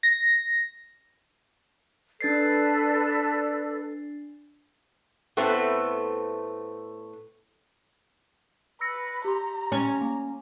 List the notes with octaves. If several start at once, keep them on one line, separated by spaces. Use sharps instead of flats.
A#6
D4 A4 B4 D5 A6 C7
A2 A3 B3 C4
B4 E6 A#6 C#7
G4 A#5 C6
C#4
A#3